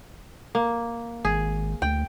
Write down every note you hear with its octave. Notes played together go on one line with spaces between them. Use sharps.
A#3
G#1 G#4
D2 G5